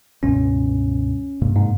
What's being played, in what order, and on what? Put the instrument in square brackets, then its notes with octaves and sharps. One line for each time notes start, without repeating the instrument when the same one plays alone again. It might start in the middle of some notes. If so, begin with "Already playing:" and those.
[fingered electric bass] C#2 G2 B2 [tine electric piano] C#4
[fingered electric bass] G2 C3 A#3
[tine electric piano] G#2